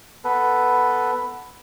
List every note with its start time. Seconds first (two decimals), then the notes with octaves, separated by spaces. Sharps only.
0.24 B3 A4 B4